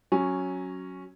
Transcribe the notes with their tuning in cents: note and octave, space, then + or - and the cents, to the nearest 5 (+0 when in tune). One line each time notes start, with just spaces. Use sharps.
F#3 +0 C#4 -5